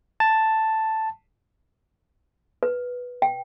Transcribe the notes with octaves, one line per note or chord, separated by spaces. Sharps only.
A5
B4
G5